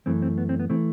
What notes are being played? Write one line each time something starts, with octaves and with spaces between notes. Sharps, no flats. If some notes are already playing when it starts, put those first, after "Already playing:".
F#2 E3 A3 C4
C4
B3
C4
B3
E3 A3 C4